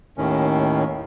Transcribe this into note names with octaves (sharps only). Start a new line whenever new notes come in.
D#2 A2 D#3 C#4